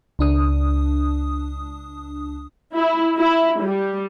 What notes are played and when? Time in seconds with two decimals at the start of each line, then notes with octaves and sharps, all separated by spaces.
0.19 C#2 D4 D#6
2.75 E4
3.17 E4
3.62 G3